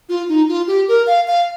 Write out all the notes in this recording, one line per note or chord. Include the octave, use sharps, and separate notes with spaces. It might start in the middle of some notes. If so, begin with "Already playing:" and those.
F4
D#4
F4
G4
A#4
F5
F5